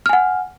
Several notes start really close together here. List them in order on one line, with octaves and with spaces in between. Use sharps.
F6 G#5 F#5